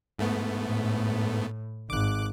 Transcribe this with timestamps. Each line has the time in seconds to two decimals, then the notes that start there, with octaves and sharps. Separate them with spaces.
0.19 G#2 A3 B3
0.60 A2
1.90 G#1 D6 F#6